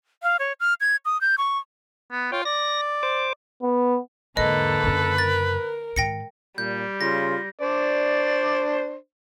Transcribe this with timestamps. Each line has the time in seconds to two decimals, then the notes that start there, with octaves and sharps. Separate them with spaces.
0.23 F5
0.39 C#5
0.60 F6
0.81 G#6
1.05 D#6
1.21 G6
1.38 C#6
2.12 B3
2.32 F4 C#5 G5
2.45 D5 A#6
3.03 C5 D6
3.62 B3
4.37 E2 G#2 D3 A#3 A4 B4 D#5
4.83 F#2 C#3
5.18 A#4 A6
5.96 G#2 D#3 G5 A#6 C#7
6.58 A#2 G3 G6
7.01 C#3 F4 C6 A#6
7.61 D4 C5 D5